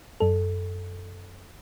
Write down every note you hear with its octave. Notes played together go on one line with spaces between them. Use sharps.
F#2 A4